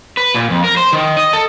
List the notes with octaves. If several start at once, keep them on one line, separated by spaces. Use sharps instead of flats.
B4
A#2
F2
A#4
C5
D#3
D#5
A4